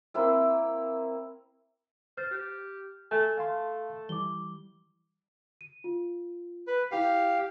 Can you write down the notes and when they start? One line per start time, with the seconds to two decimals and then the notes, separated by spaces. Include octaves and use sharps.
0.14 A#3 C4 E4
2.17 C5 F6 A6
2.31 G4
3.11 A3 A4 G#5
3.37 A3 F5 A5 C6
4.09 E3 G3 D6 G7
5.61 D#7
5.84 F4
6.67 B4
6.91 E4 G4 F5 G5 C7